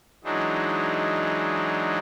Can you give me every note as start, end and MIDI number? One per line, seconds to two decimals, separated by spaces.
0.24 1.99 52
0.24 1.99 54
0.24 1.99 56
0.24 1.99 62
0.24 1.99 63